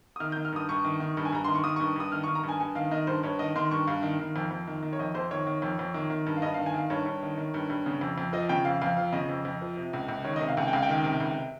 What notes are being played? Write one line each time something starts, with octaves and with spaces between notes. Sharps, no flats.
D#6
D#3 F6
G6
D#3
F6
G2 D#6
G2 C#6
D#3
D#3
G2
G#5
G2 A#5
D#3 C6
C#6
D#3 D#6
C#6
G2
G2 D#6
D#3 F6
C#6
D#3
A#5
G2
G#5
G2 G#5
D#3 F5
D#3 D#5
G2 C5
G2 C#5
D#3 D#5
D#3 C6
G2 C#6
G2 F5
D#3
D#3
F2
F2
D#3
D#3
C#5
F2 D#5
F2 C5
D#3 C#5
D#3
F2
F2
D#3
D#3
G2
F5
G2 D#5
F5
D#3
G#5
D#3 F5
G2 C#5
G2
D#3
D#3
G2
G2
C#3
F2
F2
F3 D#5
C#3 G5
F2 F5
F2 F5
F3 F5
C#3 D#5
F2
F2
F3
C3
C#2
C#2
D#3 C#5
D#5
C3
F5
C#2 G#5
G5
C#2 F5
G5
D#3
C3
C#2